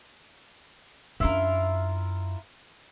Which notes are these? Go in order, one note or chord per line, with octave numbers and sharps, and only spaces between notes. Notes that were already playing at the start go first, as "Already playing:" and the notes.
F#2 D4 E4 F4 A#4